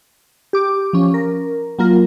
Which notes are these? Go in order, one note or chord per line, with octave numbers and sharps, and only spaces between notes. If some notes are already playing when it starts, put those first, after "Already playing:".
G4 D6
F3 C#4
A#4
F#3 A#3 F4 A#4